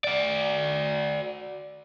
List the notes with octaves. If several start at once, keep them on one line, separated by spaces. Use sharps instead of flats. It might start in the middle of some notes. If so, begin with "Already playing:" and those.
F#4 D5